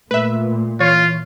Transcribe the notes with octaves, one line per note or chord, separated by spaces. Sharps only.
A#2 A3 B4 E5
E3 F4 C#5